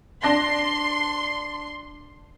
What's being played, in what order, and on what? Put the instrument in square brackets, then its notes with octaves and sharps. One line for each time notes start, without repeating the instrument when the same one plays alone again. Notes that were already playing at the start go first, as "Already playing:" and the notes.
[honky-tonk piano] D4 A#6 [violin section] C6